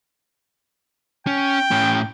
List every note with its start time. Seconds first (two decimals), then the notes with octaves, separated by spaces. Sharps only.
1.27 C#4 G5
1.71 A2 C#4